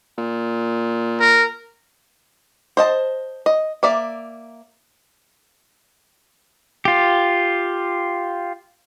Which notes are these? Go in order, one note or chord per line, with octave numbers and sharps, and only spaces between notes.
A#2
A#4
C5 D#5 A5
D#5
A#3 D5 E5
F4 G4